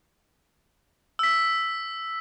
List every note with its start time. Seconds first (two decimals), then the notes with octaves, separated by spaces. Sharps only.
1.19 E6 B6